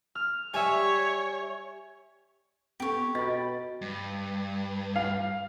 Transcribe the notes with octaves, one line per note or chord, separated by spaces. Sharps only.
F6
G3 C#5 E5 G#5
B3 G4 A4 C#5
B2 D#5 B5 A6
G2
F5